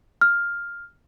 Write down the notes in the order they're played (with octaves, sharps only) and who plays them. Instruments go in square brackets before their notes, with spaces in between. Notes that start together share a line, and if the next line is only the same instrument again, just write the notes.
[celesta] F6